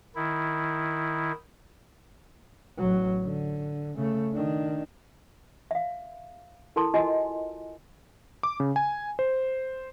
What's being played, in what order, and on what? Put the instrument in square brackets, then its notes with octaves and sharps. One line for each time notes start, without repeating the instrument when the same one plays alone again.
[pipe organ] D#3 E4
[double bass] A1 F#3
D3
C#3 A3
D#3 D4
[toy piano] E5 F5
E4 A4 A#4 A5 C6
F4 F#4 D#5 G#5
[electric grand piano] D6
C#3
G#5
C5